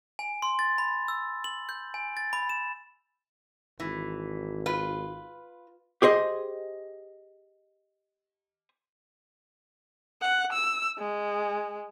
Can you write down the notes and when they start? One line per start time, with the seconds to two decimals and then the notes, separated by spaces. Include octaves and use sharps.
0.19 G#5
0.42 C6
0.59 A6
0.78 B5
1.08 E6
1.44 F#7
1.69 G6
1.94 G#5
2.17 A6
2.33 B5
2.49 E7
3.80 G#1 E3
4.66 F4 B4
6.02 G4 G#4 C5 D#5
10.21 F#5
10.53 E6
10.98 G#3